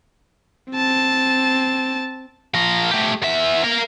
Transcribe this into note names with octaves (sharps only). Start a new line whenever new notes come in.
C4 A5
F3 A#4
A3 G4
E2 E5
A#4 F5